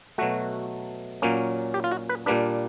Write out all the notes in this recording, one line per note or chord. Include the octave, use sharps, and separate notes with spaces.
B2 F#3 A3 F#4
A#2 F#3 A#3 C#4
G4
F4
F#4
B4
A#2 G3 A#3 D4 B4